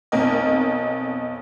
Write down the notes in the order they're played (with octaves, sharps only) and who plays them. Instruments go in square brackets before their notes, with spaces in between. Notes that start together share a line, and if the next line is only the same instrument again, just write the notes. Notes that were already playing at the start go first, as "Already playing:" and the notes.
[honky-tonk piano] B1 F2 A#4 D#5